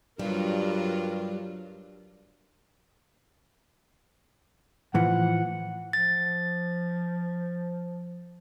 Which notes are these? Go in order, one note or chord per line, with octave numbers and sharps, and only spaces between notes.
G2 F#3 G3 D4 F4 A#4
A2 E3 F3 F#5
F3 A6